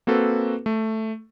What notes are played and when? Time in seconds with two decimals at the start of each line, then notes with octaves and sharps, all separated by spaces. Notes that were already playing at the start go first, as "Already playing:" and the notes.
0.07 A#3 C4 F#4 A4 B4
0.66 A3